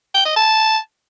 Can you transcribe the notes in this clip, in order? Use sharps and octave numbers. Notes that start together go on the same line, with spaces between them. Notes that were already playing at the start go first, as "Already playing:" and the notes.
G5
D#5
A5